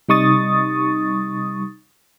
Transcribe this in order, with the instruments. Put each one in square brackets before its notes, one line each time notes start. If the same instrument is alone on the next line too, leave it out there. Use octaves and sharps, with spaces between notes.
[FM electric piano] C3 G3 D#4 C#6 D#6 A6